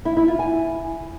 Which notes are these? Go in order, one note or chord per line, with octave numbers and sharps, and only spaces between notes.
E4
E4
F4
G#5